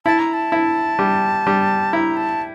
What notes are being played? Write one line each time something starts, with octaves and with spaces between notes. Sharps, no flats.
E4 A5
A#5
A5
E4
G3
G3
E4 A#5
A5